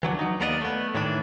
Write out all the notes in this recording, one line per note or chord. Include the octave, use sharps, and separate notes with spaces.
E3 F#3 C#4 D4
F#3 D#4
D#2 A#3 B3 A#4 D5 D#5
A3 B3
A2 D#3 E3 D4